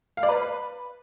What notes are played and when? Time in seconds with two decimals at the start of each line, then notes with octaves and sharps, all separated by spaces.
0.17 F5
0.23 D5
0.29 B4